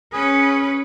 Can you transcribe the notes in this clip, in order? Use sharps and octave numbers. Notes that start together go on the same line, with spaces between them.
C#4 G#4 B4